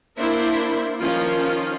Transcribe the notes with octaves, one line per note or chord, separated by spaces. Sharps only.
A#3 D4 E4 A#4 C5 E5
D#3 F3 C#4 F4